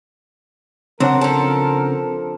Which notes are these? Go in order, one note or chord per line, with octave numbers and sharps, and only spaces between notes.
C#3 F#3 C4 D4 A#4 F#5
F3 A4